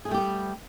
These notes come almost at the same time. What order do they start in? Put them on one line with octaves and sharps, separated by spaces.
G#4 A3 G3 G4 B3